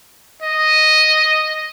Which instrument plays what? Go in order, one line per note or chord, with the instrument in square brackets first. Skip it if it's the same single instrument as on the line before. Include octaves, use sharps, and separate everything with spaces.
[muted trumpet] D#5